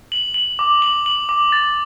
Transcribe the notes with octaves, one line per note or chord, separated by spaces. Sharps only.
F#7
F#7
D6
F#7
F#7
D6
A6